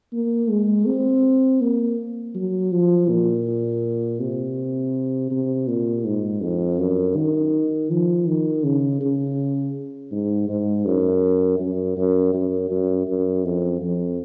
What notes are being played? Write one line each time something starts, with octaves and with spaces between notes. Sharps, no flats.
A#3
G#3
C4
A#3
F#3
F3
A#2
C3
C3
A#2
G#2
F2
F#2
D#3
F3
D#3
C#3
C#3
G#2
G#2
F#2
F#2
F#2
F#2
F#2
F#2
F2
F2